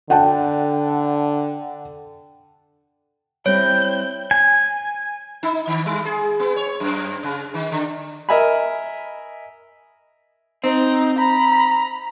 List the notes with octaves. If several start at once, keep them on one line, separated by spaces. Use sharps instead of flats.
D3 F#5 G5 A5
G3 C4 E4 C#5 G6
G#5
D#4
D#3
G3
G#4
B3
C#5
F#2
C#3
D#3
D3
A#4 D#5 E5 G#5 A#5 B5
C4 D#4
A#5 B5